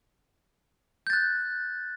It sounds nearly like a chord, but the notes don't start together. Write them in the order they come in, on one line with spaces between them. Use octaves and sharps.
G6 A6 F#6